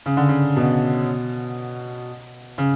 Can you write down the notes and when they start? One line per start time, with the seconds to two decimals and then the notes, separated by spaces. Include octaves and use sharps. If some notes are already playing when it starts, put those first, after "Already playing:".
0.06 C#3
0.17 D3
0.29 C#3
0.57 B2
2.58 C#3